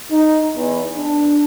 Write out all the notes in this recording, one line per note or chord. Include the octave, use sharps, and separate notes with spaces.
D#4
E2
D4